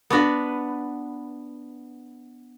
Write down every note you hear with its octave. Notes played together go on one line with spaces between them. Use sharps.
B3 D4 F#4 B4